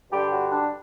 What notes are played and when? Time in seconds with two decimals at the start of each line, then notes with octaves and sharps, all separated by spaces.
0.11 G2 D3 G3 G4
0.31 F#4
0.52 D4